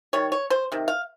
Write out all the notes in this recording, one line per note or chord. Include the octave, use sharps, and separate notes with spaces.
D#3 G3 C#5
C#5
C5
C3 D#3
F5